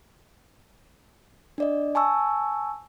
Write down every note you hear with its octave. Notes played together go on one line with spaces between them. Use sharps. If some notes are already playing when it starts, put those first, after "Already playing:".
D4 D5 D#5
G#5 A5 C#6 E6